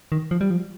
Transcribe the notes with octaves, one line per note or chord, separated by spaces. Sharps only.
D#3
F3
G3
F3